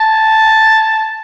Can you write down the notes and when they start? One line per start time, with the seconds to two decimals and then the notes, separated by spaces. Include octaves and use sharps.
0.01 A5